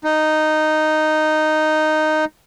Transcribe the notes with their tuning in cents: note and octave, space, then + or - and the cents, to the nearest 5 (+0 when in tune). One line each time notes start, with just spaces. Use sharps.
D#4 -5